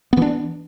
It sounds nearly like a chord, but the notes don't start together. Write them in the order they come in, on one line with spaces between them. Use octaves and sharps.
B3 E3 D4